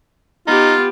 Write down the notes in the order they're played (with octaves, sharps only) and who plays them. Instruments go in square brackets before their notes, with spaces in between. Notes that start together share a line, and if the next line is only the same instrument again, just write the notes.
[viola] B3 G4 [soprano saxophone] D#4 [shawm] F4